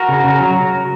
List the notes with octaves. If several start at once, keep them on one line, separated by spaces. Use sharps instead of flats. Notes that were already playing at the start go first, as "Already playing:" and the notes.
Already playing: F#4 A#4
C#3
C#3
F#3